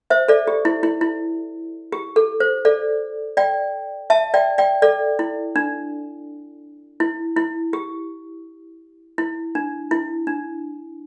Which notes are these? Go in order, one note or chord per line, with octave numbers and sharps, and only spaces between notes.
C5 E5
A4 D5
G4
E4
E4
E4
G4
A4
C5
A4 D5
D5 G5
E5 A5
D5 G5
D5 G5
A4 D5
E4
D4
E4
E4
G4
E4
D4
E4
D4